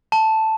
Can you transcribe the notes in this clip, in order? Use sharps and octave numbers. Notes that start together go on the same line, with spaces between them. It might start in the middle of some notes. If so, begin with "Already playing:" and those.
A5